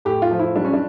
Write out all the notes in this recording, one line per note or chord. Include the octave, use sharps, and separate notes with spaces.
A2 G4
F4
F3
E4
G3 D4
C#4
D4